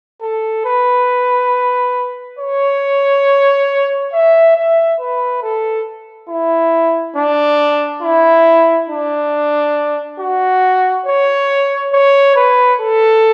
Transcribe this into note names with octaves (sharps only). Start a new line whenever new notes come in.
A4
B4
C#5
E5
E5
B4
A4
E4
D4
E4
D4
F#4
C#5
C#5
B4
A4